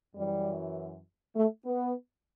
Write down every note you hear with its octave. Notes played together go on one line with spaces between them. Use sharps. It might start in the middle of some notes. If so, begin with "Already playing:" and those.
F#2 E3 G3
A3
B3